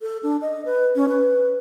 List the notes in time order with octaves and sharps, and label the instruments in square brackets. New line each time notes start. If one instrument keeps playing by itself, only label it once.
[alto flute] A4
D4
D#5
B4
C#4
B4